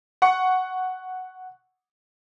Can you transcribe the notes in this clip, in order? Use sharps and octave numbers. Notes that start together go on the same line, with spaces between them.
F#5 C#6 C#7